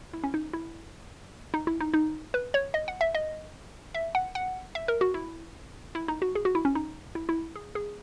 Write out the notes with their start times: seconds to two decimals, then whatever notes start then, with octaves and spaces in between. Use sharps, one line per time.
0.13 E4
0.24 C#4
0.34 D#4
0.53 E4
1.54 D#4
1.67 E4
1.81 D#4
1.94 D#4
2.34 B4
2.54 C#5
2.74 D#5
2.88 F#5
3.01 E5
3.15 D#5
3.95 E5
4.15 F#5
4.35 F#5
4.75 E5
4.88 A#4
5.01 F#4
5.14 E4
5.95 E4
6.08 D#4
6.22 F#4
6.35 G#4
6.45 F#4
6.55 E4
6.65 C#4
6.75 D#4
7.15 E4
7.29 E4
7.56 G#4
7.75 G#4